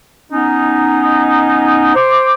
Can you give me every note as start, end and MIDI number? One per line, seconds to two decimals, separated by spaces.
0.32 1.93 59
0.32 1.93 61
0.32 1.93 63
1.95 2.34 72
1.95 2.34 86